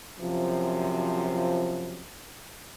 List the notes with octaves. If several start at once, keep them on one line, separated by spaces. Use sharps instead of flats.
F#2 C3 F3